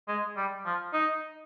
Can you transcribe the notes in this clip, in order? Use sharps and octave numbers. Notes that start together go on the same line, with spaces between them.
G#3
G3
F3
D#4